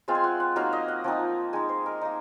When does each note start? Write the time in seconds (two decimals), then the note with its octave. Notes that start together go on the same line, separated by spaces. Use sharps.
0.08 G#3 C4 F4
0.15 G#5
0.24 F#5
0.40 F#5
0.56 F#3 A#3 D#4 F5
0.73 D#5
0.88 F#5
1.04 F3 C4 D#4
1.53 G#3 D#4 G#5
1.69 C5
1.86 A#4
2.01 A#3 D#4